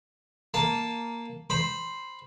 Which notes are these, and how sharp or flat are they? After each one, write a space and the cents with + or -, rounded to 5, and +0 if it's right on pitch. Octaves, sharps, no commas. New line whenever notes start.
A#3 +0 A5 -5
C5 +0 B5 +0